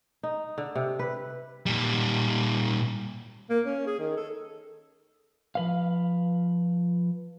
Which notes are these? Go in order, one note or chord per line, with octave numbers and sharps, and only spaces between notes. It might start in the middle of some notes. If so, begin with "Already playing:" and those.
D#4
D3
C3
B4
A#2 G3
A#3
C#4
G#4
D#3
A4
F3 B4 F5